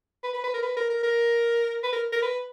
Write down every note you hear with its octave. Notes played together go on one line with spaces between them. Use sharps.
B4
B4
B4
A#4
B4
A#4
A#4
A#4
B4
A#4
A#4
B4